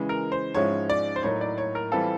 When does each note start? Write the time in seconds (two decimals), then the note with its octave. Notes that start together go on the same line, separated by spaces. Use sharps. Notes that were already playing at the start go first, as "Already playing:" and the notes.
Already playing: C#3 E3 G#3
0.09 A#4
0.32 C5
0.54 G#2 F3 G#3 C#4 E4 C#5
0.90 D5
1.16 C5
1.23 A2 F#3 A#3 D#4 C#5
1.41 D5
1.58 C#5
1.75 A#4
1.92 E3 G3 C4 F4 A4